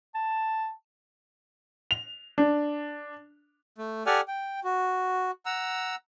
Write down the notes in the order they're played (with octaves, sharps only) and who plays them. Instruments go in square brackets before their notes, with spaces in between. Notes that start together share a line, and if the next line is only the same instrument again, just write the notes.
[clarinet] A5
[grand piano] F7
D4
[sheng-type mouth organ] A3
G4 A4 D5 F#5 G#5 F6
G5
F#4
F#5 A#5 E6